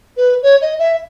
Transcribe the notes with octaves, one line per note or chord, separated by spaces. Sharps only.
B4
C#5
D#5
E5